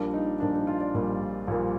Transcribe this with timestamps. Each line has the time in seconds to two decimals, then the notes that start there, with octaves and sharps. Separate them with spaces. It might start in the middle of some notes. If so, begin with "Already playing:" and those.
Already playing: A#1 A#2 G3 A#3 D4
0.14 D#4
0.40 A#1 A#2 G3 A#3 D4
0.54 D#4
0.67 F4
0.81 D5
0.94 A#1 A#2 G3 A#3
1.47 A#1 A#2 G3 A#3